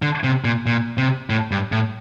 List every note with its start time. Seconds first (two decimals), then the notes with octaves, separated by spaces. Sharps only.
0.02 D3
0.24 C3
0.44 A#2
0.66 A#2
0.98 C3
1.30 A2
1.51 G2
1.72 A2